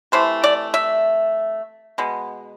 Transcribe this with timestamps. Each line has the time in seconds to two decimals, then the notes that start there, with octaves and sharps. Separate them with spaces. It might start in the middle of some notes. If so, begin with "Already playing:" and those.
0.12 C3 E3 A3 C5
0.44 D5
0.74 E5
1.98 B2 G#3 B3